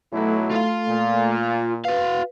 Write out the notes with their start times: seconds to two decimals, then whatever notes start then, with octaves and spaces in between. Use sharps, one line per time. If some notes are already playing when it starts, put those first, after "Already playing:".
0.13 B1 F#3 A3 E4 A4
0.51 F4 F5
0.88 A#2
1.85 F#4 B4 F5